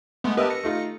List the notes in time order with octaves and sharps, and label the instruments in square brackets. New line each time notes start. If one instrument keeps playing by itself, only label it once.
[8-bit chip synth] G#3 A3 B3
[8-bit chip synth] G4 A#4 B4 [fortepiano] D#5 E5 A5
[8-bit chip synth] A#6 C#7
[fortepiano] A3 D#4 F4